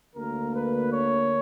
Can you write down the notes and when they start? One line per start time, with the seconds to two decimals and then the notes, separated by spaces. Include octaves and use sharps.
0.16 D2 D3 A#3 A#4
0.55 B4
0.93 C#5